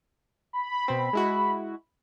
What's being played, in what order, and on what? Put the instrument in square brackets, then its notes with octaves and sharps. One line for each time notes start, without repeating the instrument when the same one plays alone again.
[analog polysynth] B5
[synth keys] B2 C4
G#3 E4 F#4